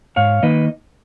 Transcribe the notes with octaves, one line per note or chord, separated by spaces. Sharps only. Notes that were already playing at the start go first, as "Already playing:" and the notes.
G#2 C#5 F5
D#3 A#3 D#4 B4 D#5